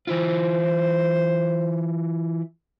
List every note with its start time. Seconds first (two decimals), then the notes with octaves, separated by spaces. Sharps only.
0.07 E3 E4 F4 C5